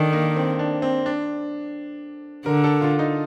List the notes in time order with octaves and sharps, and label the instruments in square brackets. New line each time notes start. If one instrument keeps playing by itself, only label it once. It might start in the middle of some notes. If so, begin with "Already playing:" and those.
Already playing: [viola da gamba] D#3 [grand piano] D4 A4
[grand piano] A#3
C4
D4
C4
D4
[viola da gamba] D3 [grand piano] A#4
[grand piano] A4
F4
D#4